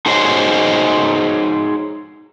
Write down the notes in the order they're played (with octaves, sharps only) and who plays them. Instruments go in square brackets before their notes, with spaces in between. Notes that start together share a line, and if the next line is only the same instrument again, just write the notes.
[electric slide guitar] D#4 F#4 G#4 C5 C#5 D#5